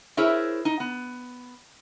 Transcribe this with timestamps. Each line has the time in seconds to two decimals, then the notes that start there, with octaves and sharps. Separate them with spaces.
0.17 E4 G#4 A#4 C5 C#5 E5
0.65 D#4
0.80 B3